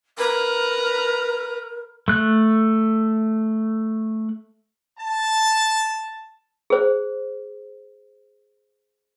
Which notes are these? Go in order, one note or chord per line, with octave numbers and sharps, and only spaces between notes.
A#4 B4 A#5
A3 F#6
A5
G#4 C5